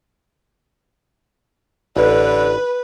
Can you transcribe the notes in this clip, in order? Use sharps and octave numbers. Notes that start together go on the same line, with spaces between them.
A1 D3 B4